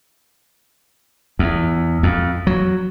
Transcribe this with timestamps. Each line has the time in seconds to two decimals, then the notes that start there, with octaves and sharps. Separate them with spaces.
1.39 E2
2.03 F2
2.47 F#3